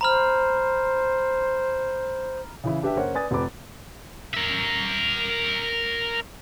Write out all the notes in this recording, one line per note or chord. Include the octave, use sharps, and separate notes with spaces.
C5 A#5 B5 F6
C#3 E3 E4
D4 G4 B4 E5
F#1 A#4 C5 C#5 F#5
B4 D5 G#5 D#6 A6
F1 C3 B4 B5 D6
A#4 E5